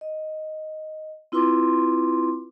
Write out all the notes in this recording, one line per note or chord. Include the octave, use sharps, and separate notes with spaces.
D#5
C4 E4 F4 B4 C6 D6